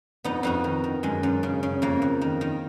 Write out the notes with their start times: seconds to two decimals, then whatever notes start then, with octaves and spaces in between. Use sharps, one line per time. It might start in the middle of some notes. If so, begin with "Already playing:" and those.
0.24 F2 B3 D#4
0.43 F2 D#4 F#4
0.64 D#3
0.84 D#3
1.03 F#2 G#3
1.23 F#2
1.43 C#3
1.63 C#3
1.82 F2 A#3
2.02 F2
2.21 D#3
2.41 D#3